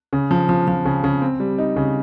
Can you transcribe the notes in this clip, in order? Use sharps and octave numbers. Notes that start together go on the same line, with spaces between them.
C#3
F3
F3
F3
C#3
C#3
C4
G3
D#4
C#3